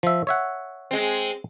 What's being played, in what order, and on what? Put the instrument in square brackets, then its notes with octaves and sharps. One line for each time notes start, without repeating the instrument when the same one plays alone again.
[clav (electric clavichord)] F3 E5
C#5 E5 F#5
[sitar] G#3 C4